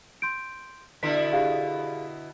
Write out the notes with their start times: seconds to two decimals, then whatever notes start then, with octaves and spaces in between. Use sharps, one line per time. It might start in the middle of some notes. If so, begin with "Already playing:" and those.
0.22 C6 G6 D7
1.03 B2 D3 E4 B6
1.33 G4 G#4 F5